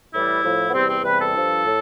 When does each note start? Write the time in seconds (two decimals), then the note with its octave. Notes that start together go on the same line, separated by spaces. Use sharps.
0.13 A2 E3 G3 E4
0.44 A2 F3
0.70 B3
0.74 E2 C3 G3 C4
0.89 C4
1.04 E2 C3 E3 G3 B4
1.20 A4
1.35 G2 F3
1.65 A2